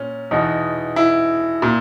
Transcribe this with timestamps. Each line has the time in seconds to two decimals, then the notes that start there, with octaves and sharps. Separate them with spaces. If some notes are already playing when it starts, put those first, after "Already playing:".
Already playing: A#2 C#4
0.31 E2 B2 D#4
0.96 E4
1.62 A#2